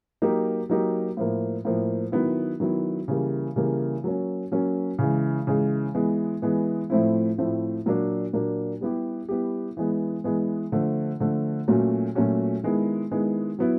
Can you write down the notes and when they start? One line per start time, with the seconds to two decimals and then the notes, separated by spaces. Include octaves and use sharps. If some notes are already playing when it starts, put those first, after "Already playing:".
0.22 F#3 A#3 D#4 G4
0.70 F#3 A#3 D#4 G4
1.17 A2 F3 A#3
1.65 A2 F3 A#3
2.12 D#3 F#3 B3 E4
2.60 D#3 F#3 B3 E4
3.08 C#3 E3 G3 A#3
3.56 C#3 E3 G3 A#3
4.04 F#3 A#3 C#4
4.52 F#3 A#3 C#4
4.99 C#3 E3 G#3
5.47 C#3 E3 G#3
5.95 E3 G#3 B3
6.42 E3 G#3 B3
6.90 A2 F3 A3 C4 E4
7.38 A2 F3 A3 C4 E4
7.86 A#2 F#3 A#3 D4
8.33 A#2 F#3 A#3 D4
8.81 G3 B3 E4 G4
9.29 G3 B3 E4 G4
9.77 E3 G#3 B3
10.24 E3 G#3 B3
10.72 D3 F3 A3
11.20 D3 F3 A3
11.68 A#2 F#3 A3 C#4 F#4
12.15 A#2 F#3 A3 C#4 F#4
12.63 D#3 G#3 B3 E4
13.11 D#3 G#3 B3 E4
13.59 F#3 B3 E4